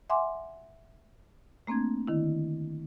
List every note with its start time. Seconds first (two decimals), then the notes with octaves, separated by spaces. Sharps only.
0.10 E5 F#5 G#5 C6 D6
1.67 A3 A#3 C4 D4 G#6
2.08 D3 D#3 E4